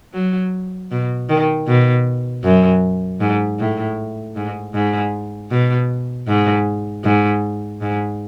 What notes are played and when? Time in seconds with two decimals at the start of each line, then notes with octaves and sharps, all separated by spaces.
0.14 F#3
0.91 B2
1.29 D#3
1.68 B2
2.44 F#2
3.20 G#2
3.59 A2
4.37 G#2
4.74 G#2
5.51 B2
6.28 G#2
7.04 G#2
7.82 G#2